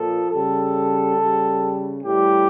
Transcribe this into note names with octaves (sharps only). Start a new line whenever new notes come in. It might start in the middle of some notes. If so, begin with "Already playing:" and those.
Already playing: A#2 F3 A4
C#3 G3 A4
C#3 G3
A2 E3 G3 G4